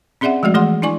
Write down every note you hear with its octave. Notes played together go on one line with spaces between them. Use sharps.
C4 C#4 G#4 D5 E5 F#5
F3 G#3 A3 F#4 D5
E3 A3 G#4 F#5 C6
D4 E4 D5 G#5 C#6